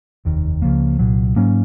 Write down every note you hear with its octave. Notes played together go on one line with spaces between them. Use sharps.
F1 D#2 D#3
C#2 C#3 F3 A#3
C2 A#2 F#3
G#2 F#3 A#3 C#4